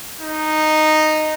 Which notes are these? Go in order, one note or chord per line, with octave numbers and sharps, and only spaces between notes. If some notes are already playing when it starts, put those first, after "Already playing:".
D#4